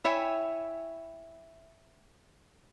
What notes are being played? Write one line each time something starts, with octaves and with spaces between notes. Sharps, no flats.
E4 C#5 E5 G5 G#5